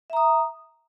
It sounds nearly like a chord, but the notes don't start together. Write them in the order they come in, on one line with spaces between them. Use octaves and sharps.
E5 A#5 D#6